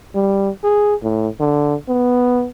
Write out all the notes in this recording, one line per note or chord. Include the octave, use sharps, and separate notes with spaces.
G3
G#4
A2
D3
B3